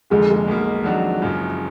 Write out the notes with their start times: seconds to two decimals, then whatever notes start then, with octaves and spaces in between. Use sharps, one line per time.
0.10 F1 F2 D3 G#3
0.31 G#3
0.48 B1 B2 A#3
0.83 F2 D#3 F#3 D4 F#4
1.20 F#1 F#2 F3